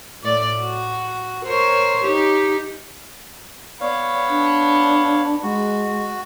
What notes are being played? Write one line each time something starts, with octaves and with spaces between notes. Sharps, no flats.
A2 D5
F#4
A#4 C5 C#5
D#4 G4
B3 C#5 D5 F5
D4
G#3 F#4